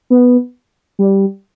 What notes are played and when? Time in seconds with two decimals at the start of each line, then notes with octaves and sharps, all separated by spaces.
0.10 B3
0.99 G3